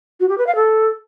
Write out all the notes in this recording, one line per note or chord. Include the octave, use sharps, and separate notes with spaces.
F#4
G4
B4
F5
A4